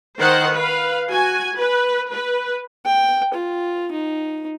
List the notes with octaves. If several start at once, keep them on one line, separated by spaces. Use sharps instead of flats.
D#3 C5 F#5
B4 F5
F#4 G#5
B4
B4
G5
F4
D#4